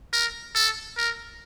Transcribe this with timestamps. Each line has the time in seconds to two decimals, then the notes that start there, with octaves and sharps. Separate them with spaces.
0.13 A#4
0.55 A4
0.97 A#4